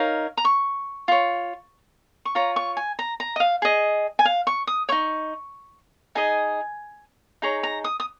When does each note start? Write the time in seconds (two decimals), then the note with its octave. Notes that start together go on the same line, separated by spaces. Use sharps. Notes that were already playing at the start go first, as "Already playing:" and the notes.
Already playing: D#4 A#4 C#5 F5
0.37 A#5
0.45 C#6
1.08 F4 C#5
2.25 C#6
2.35 F4 C#5 A#5
2.56 C#6
2.77 G#5
2.99 A#5
3.20 A#5
3.36 D#5
3.40 F5
3.62 G#4 D#5
4.19 G#5
4.25 F5
4.47 C#6
4.67 D#6
4.89 D#4 C#5 C#6
6.15 D#4 G#4 D#5 G#5
7.42 D#4 G#4 C#5 A#5
7.63 A#5
7.84 D#6
8.00 D#6